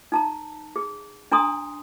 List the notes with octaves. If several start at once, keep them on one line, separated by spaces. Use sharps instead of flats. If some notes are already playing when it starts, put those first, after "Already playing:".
D#4 A5 A#5
G#4
D4 G#5 A#5 C6 D#6